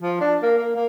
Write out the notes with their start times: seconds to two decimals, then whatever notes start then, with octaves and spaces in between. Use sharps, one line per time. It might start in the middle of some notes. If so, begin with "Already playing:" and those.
0.02 F3
0.21 D4
0.43 A#3
0.58 A#3
0.75 A#3